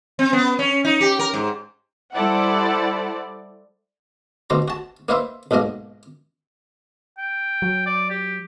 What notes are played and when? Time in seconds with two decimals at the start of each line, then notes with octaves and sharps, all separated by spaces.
0.19 C4
0.33 B3
0.59 C#4
0.85 D#4
1.01 G4
1.19 A#4
1.34 G#2
2.13 G3 E4 A4 C5 D5 F#5
4.50 D2 B2 C5 A#5
4.68 F#4 A5
5.09 A#3 D#4 B4 C5 E5
5.51 B1 G#2 B2 A#3 D#5
7.18 G5
7.62 F#3
7.86 D5
8.10 G4